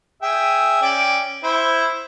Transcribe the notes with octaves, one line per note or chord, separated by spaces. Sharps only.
G#4 E5 G5
C#4 D5 G5
E4 C5